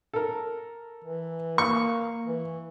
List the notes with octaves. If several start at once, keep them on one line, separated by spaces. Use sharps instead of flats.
A4 A#4
E3
A#3 C#6
E3